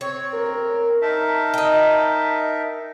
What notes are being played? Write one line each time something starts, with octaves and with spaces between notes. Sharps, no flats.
C4 C#5
A#4
D#4 A#4 E5 A5
D#5 G5